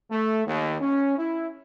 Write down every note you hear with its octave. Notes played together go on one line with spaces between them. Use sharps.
A3
D#2
C#4
E4